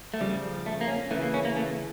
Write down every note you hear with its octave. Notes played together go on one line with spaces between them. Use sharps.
A3
C#3 F3 G3
A3
A#3
C#4
C#3 E3 A3
A#3
C#4
A#3
A3